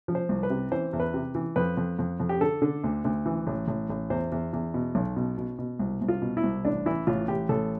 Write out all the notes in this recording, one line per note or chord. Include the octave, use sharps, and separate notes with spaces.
F3
C5
C2
B4
C3
E3 C5
E2
B4
C3
E3
F2 B4
F2
F2
F2
G4
D3 A4
D3
D2
D2
E3
A1
A1
A1
E2 C5
E2
E2
B2
B1
B2
B2
B2
C2
C2
F4
B2
E4
C2
A1 D4
E3 E4
A1 F4
A1 G4
A1 A4